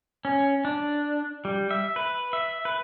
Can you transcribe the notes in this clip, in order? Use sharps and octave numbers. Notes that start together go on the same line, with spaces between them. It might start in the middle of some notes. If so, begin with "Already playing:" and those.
C#4
D4
G3
E5
B4
E5
B4